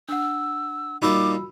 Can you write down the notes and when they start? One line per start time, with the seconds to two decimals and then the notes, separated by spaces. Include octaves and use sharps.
0.08 D4 F#5 E6
1.02 A#2 G3 D#4 F#4 B5 D6 E6